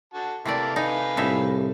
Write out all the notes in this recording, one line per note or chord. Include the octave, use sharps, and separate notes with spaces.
D3 F#4 A5
C3 E3 A3 A#3 E4 D5
D#4 B4 F5 G#5
C2 A2 D#4 E5